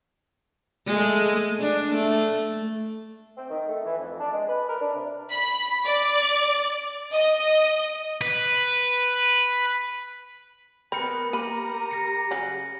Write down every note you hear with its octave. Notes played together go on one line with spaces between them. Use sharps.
G#3 A3
D4
A3
C4
D#3
A3
E3
F2
D4
G#3
B4
A#4
D4
C3
B5
D5
D#5
B4
B3 C4 A#4 B4 B5 C#7
A#3 G4 A#4 A#5 B5 D#7
A#6 C#7
C#3 F#3 C#4